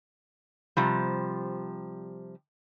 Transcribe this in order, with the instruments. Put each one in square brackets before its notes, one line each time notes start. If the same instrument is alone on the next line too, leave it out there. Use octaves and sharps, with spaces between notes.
[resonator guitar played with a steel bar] C3 F3 G3